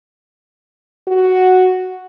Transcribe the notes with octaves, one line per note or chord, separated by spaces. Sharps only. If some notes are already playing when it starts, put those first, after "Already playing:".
F#4